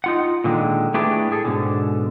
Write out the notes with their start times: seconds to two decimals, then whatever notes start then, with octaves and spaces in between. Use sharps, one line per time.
0.04 D#4 F4 F#5
0.44 A#2 D3 D#3 G#3
0.94 A3 D4 E4 G4 G#4 B4
1.31 A2 G#4 A4
1.45 G#2 B2 D3